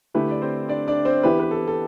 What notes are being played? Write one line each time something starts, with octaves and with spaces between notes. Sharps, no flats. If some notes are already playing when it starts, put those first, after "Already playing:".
D3 A3 E4 G4 B4
D5
C4 C5
D4 D5
D4 D5
C4 C5
E3 B3 E4 G4 B4
B4
A4
A4